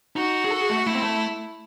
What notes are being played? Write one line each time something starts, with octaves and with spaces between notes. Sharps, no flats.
D#4 F#4
G#4
A4
G#4
A3
A3 E4
C4
A3